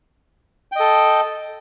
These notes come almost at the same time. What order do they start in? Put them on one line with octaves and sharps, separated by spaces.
G5 D#5 A4